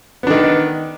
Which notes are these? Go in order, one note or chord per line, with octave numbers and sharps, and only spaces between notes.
D#3 B3 D4